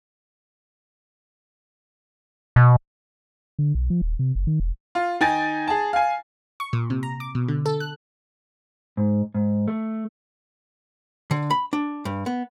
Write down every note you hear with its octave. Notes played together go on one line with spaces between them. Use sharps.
B2
D3
B1
F3
D#1
C3
F#1
D#3
E1
F4
D#3 D#4 G5 G#5 A6
G#4 A5
F5 G#5
C#6
A#2
C3
A#5
D6
B2
D3
A4
F#6
G#2
G#2
A3
D3
B5
D4
G2
B3